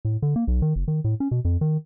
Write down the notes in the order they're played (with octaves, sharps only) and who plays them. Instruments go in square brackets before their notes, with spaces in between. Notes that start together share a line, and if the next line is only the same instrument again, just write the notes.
[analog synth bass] A2
D3
A#3
B1
D#3
F#1
D#3
A2
C#4
B2
F2
D#3